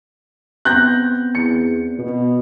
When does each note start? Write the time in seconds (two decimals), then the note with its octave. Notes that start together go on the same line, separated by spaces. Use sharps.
0.65 B3 C4 F#6 G6 A#6
1.35 E2 C#7
1.99 B2